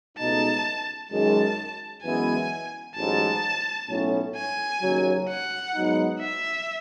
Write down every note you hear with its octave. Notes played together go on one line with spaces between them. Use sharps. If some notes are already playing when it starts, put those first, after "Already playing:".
C#2 B2 A3 D#4 A5
F#2 D#3 G#3 A5
F#2 E3 G#3 B3 E4 G#5
A1 G#2 F#3 A5
B1 A2 F#3 A3 C#4
G#5
D#2 C#3 F#3
F#5
G#2 F#3 B3 D#4
E5